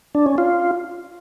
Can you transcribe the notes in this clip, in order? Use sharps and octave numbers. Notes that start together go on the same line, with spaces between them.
D4
C#4
F4